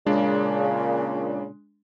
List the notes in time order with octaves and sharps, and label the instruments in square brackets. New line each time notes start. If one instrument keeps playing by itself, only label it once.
[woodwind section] A#2 C#3 [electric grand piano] G#3 D4